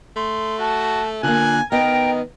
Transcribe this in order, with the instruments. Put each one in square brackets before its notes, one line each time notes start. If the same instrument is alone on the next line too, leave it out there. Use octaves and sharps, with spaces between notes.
[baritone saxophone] A3 [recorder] C6
[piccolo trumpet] F#4 [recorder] A5
[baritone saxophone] A#2 [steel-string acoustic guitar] D3 A#3 [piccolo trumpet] G#5 [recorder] F#6
[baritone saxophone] D#3 [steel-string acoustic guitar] B3 D#5 [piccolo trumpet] A#4 [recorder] G5